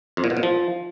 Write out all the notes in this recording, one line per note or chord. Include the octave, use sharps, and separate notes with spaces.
F2
A#2
B2
A#2
F3